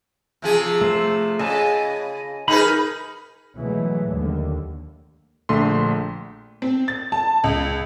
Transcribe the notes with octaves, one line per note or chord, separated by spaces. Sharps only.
C3 F3 G#4
A3 C5
C#3 D#5 G#5 A5
D#4 G#4 A#4 B4 B5
B2 E3 F#3 G#3 A3
D#2 D3
A#1 D3 A3 C6
C4
A6
A5
C#2